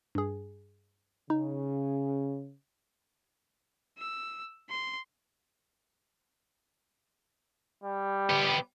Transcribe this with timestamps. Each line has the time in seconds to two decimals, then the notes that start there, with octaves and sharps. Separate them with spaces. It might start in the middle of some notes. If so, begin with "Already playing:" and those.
0.15 G2 G#4
1.30 C#3 D#4
3.98 E6
4.70 C6
7.84 G3
8.30 B3 G4